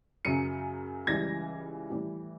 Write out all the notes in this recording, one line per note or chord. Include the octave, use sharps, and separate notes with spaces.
F#2 C#3 F#3 C#7 D#7
C#2 C#3 E3 G3 G#6 A#6
A2 E3 G3